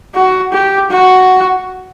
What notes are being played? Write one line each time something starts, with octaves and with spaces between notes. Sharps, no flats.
F#4
G4
F#4